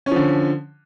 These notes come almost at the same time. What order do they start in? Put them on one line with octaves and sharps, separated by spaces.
C#4 F3 D3